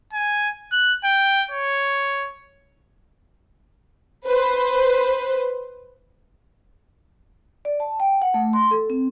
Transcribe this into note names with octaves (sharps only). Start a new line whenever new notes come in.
G#5
F#6
G5
C#5
B4 C5
D5
A5
G5
F#5
A3
C6
A4
C4